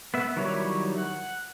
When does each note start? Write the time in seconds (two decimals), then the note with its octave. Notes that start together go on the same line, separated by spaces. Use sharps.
0.14 B3 E5
0.36 D#3 F#3 G3 E4 C#5
0.98 F#5